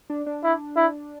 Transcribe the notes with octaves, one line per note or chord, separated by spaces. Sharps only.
D4
D4
E4
E4